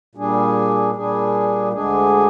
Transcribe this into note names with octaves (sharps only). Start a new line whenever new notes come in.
A#2 G3 D4 G#4
A#2 G3 D4 G#4
D2 D3 G#3 D4 G#4